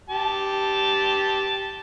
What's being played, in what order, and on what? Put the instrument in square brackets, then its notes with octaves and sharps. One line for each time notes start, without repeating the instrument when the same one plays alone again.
[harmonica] G4 A5